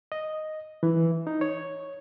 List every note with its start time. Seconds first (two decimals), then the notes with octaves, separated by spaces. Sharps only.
0.12 D#5
0.83 E3
1.27 D#4
1.41 C#5